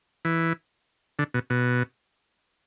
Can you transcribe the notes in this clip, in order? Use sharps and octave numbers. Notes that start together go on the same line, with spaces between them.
E3
D3
B2
B2